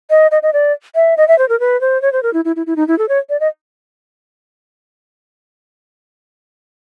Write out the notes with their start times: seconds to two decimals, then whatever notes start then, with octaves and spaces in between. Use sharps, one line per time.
0.10 D#5
0.31 D#5
0.43 D#5
0.53 D5
0.95 E5
1.17 D#5
1.28 E5
1.38 C5
1.49 A#4
1.60 B4
1.81 C5
2.02 C#5
2.13 C5
2.23 A#4
2.34 E4
2.45 E4
2.56 E4
2.67 E4
2.76 D#4
2.88 E4
2.99 A4
3.09 C#5
3.30 D5
3.40 D#5